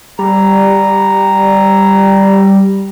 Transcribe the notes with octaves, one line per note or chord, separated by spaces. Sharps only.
G3 A#5